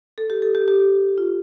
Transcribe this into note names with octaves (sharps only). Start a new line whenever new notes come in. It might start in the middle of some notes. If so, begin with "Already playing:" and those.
A4
G4
A4
G4
G4
F4